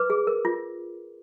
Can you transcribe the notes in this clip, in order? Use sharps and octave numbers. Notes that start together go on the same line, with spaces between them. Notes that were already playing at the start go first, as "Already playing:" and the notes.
Already playing: B4 D6
G#4
A#4
F4